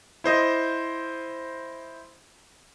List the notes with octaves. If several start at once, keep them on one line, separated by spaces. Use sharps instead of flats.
E4 C5 D#5